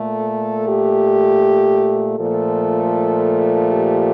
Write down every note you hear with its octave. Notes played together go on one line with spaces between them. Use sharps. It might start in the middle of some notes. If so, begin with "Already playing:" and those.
Already playing: A#2 A3 A4
G4
A#2 F3 A3 A4
G4